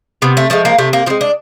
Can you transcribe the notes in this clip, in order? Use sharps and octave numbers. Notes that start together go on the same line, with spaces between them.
C3 B3
A3
F3 G#3 A3
A#3
C3 A3
A#3
F3 G#3 C4
D4